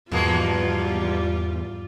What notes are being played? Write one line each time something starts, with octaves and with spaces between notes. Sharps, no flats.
E2 G#2 B2 F3 G3 G#3 A#3 F4